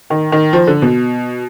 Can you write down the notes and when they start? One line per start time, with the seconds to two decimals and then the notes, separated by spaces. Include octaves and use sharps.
0.10 D#3
0.32 D#3
0.53 F3
0.67 D3
0.82 B2